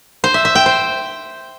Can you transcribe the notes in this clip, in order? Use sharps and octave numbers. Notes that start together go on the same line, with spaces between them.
C5
E5
E5
G5
C5